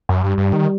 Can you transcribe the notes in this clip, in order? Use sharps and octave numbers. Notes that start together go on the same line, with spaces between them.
F#2
G2 G3
G2
D#3